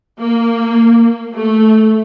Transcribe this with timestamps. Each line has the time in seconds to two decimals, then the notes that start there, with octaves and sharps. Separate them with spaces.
0.20 A#3
1.35 A3